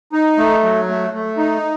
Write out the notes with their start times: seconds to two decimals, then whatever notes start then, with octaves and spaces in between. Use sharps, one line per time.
0.13 D#4
0.37 A3
0.62 F#3
0.88 A3
1.13 A3
1.37 D#4